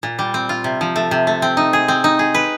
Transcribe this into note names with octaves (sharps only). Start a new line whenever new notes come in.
A#2
G3
C4
F4
C3
F3
A3
C3
A3
C4
D#4
G#4
C4
D#4
G#4
B4